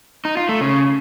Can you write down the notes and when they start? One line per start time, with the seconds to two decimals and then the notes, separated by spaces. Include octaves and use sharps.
0.25 D#4
0.37 F4
0.49 A3
0.61 C#3